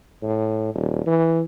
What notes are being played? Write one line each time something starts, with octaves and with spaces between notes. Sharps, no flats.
A2
D#1
E3